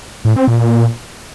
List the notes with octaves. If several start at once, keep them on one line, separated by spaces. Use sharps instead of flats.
A2
C4
A#2